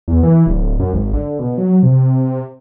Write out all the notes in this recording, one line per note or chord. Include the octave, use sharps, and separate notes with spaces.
E2
E3
D1
F#2
G#1
D3
B2
F#3
C3